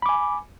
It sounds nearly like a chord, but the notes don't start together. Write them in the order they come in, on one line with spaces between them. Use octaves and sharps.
B5 D6 G#5